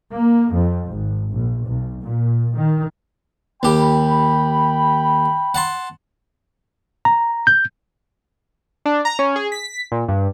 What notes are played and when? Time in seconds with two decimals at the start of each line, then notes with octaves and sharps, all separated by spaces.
0.12 A#3
0.55 F2
0.92 G#1
1.31 A#1
1.66 B1
2.01 A#2
2.56 D#3
3.63 D#2 G4 G5 B5
5.54 F#5 A5 C6
7.05 A#5
7.47 G6
8.86 D4
9.05 A#5
9.19 C#4
9.36 G#4
9.52 B6
9.92 A#2
10.08 G2